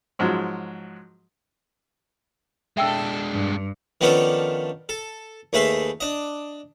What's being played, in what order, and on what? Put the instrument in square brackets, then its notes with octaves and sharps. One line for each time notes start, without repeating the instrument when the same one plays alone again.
[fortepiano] G#2 F3 F#3 G#3
[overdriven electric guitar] G#3 D4 [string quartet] A4 [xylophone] E5 G5 E6
[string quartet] G2
[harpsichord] D#3 F3 B3 C#4 D4 A4
A4
D#2 A3 G#4 B4 E5 C6
D4 D#5